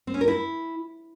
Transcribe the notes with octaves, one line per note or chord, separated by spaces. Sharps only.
C4
C#4
A#4
E4